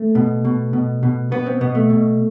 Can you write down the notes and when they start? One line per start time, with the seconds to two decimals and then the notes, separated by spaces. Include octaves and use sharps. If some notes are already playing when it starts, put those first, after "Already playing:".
Already playing: A3
0.15 B2
0.45 B2
0.73 B2
1.03 B2
1.31 B2 B3
1.46 C4
1.61 B2 B3
1.75 A3
1.90 B2